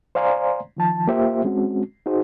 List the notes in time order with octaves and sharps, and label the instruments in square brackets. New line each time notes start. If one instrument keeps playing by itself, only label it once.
[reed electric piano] C5 D5 F5 G#5 A#5 C6
D#3 F3 A5
A#3 F4 G4 C5 E5
G#3 C4 C#4 F#4
D#4 F#4 G#4 C5